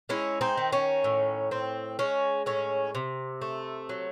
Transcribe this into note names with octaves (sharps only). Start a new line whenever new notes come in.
G#3 C#4 E4
C4 D#4
D#3
C#4
A2
C4
G#3 C#4
A2 C#4
C3
A3
F#3